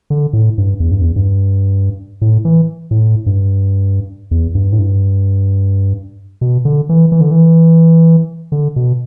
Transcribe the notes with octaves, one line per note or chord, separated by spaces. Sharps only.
D3
A2
G2
E2
G2
E2
G2
A2
E3
A2
G2
E2
G2
A2
G2
B2
D3
E3
E3
D3
E3
D3
B2